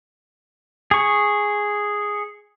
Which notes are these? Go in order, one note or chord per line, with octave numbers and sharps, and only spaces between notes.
G#4 C#6